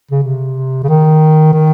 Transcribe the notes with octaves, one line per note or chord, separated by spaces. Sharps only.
C#3
C3
C#3
D#3
D#3